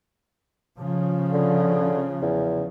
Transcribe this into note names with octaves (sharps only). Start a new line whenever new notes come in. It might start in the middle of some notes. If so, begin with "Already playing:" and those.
C#3 F3
D3
E2